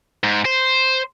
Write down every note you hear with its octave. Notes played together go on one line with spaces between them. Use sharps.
G#2
C5